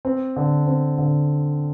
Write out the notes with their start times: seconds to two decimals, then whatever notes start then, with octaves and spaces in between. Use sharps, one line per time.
0.05 C4
0.36 D3
0.67 C4
0.98 D3